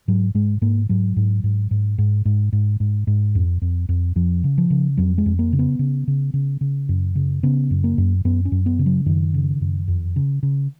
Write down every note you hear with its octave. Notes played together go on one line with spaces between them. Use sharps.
G#2 F#3
G#2 G#3
G#2 A#3
G#2 F#3
G#2
G#2
G#2
G#2
G#2
G#2
G#2
G#2
F2
F2
F2
F2 F3
C#3
F3
C#3
F2 F#3
G#3
F2
A#3
C#3
B3
C#3
C#3
C#3
C#3
F#2
C#3
C#3 B3
F#2
A#3
F#2
F#2 B3
C#4
F#2
B3
C#3
F#3
F#2 D#3
C#3
F#2
F2
C#3
C#3